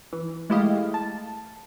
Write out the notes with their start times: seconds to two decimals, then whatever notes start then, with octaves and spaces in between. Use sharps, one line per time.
0.13 E3
0.50 G#3 A3 E4 G4 D#5 F5
0.94 A5